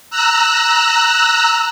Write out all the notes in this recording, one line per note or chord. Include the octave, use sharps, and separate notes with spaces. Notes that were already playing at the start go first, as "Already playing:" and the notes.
A#5 E6 F#6